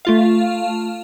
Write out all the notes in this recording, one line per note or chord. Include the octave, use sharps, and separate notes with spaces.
A3 F4 F5